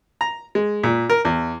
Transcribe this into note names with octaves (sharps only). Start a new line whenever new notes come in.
A#5
G#3
A#2
A#4
E2